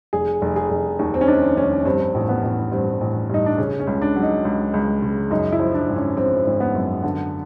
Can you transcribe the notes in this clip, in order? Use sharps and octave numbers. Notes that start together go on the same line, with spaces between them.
F1 G#4
F1
G#4
F1
D#2
C4
C#4
D#3 D4
F1 C#4
G2 C4
A1
B3
A1
G2 C4
A1
G2 D#4
D4
C#3 C#4
C#4
C#2
D4
F#3
D#4
C#2
C#2
C#3
F#2 D#4
E4
F3
D4
G#1
C#4
F3 C4
G#1
B3
F#2
D3